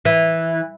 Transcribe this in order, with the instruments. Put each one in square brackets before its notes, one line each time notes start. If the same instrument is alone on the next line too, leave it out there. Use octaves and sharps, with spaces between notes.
[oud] E3